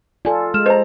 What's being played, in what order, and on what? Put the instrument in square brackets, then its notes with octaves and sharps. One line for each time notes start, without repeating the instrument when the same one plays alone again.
[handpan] F4 A4 [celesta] D5 G#5
[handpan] G#3 [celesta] F6 E7
[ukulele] C5 A#5 [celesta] D#5